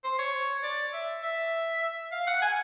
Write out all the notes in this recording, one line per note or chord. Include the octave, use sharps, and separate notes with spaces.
C5
C#5
D5
E5
E5
F5
F#5
G#5